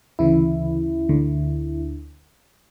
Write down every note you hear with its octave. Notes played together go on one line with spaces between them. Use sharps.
D2 C#3 E3 E4
D2 D3